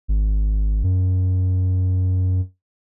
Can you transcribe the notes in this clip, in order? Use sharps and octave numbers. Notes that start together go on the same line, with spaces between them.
G#1
F#2